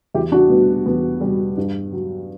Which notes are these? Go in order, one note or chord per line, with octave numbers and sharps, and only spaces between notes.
E2 E4 G4
D4 F#4
B2 G3 B3
E2 B3
G3
B2
G2
F#3